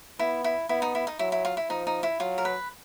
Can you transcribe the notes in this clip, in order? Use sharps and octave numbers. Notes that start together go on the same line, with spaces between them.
B3 E4
E4
B3 E4
D#4
E4
D#4
F#3 E4
E4
F4
E4
F3 D#4
D#4
E4
F#3 F4
A#4
B4